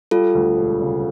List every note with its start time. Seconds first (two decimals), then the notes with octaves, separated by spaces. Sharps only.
0.11 G3 F4 A4
0.35 D2
0.57 E1
0.81 C#3